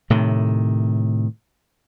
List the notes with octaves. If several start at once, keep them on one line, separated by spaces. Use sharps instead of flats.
A2 C3 D#3